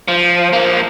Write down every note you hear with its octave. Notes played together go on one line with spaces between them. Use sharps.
F3
F3 A#3